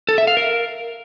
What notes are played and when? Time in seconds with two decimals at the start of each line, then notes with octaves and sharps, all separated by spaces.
0.09 A4
0.18 E5
0.27 F5
0.37 A#4